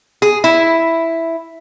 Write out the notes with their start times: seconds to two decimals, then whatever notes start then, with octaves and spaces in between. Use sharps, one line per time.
0.22 G#4
0.44 E4